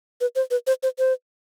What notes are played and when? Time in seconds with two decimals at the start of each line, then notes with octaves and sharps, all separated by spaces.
0.21 B4
0.36 C5
0.51 B4
0.67 C5
0.83 C5
0.99 C5